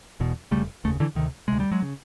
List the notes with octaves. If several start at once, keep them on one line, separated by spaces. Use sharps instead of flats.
E1 E2 B2
F1 D#2 C#3 G3 A3
F1 D#2 C#3 A3
D3 E3
D2 C3 D#3
D2 C3 G#3
G3
F#3 G#3
C#3